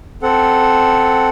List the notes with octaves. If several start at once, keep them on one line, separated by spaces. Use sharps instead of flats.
C4 A4 F#5